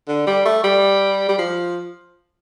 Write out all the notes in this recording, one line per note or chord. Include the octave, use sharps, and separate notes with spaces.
D3
G3
A3
G3
G3
F3